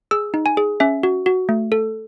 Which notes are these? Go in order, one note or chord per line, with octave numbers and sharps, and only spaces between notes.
G#4 E6
D#4
G#5
G#4
C#4 E5
F#4
F#4
A3
A4